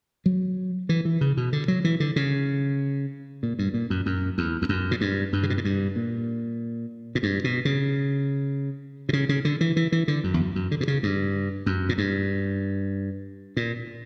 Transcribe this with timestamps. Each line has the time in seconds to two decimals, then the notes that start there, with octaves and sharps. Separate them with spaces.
0.26 F#3
0.89 E3
1.05 E3
1.21 C#3
1.37 B2
1.53 D3
1.68 F#3
1.84 E3
2.00 D3
2.16 C#3
3.43 A#2
3.59 G2
3.74 A#2
3.90 F#2
4.06 F#2
4.38 E2
4.62 E2
4.69 F#2
4.91 A#2
5.01 G2
5.33 G2
5.43 C#3
5.50 B2
5.57 A#2
5.65 G2
5.96 A#2
7.15 A#2
7.23 G2
7.44 B2
7.65 C#3
9.09 B2
9.13 C#3
9.29 C#3
9.45 D3
9.61 E3
9.76 E3
9.92 E3
10.08 D3
10.24 F#2
10.34 E2
10.40 F#2
10.55 F#2
10.71 D3
10.81 B2
10.88 C#3
11.03 G2
11.66 F#2
11.89 A#2
11.98 G2
13.57 A#2